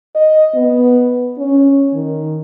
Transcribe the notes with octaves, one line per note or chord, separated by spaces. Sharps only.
D#5
B3
C#4
D#3